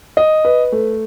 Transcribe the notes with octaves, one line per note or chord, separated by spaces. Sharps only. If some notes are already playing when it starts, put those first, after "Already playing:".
D#5
B4
A3